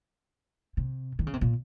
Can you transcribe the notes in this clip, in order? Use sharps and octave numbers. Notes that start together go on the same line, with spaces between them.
C3
D#3
C#3
C3
A#2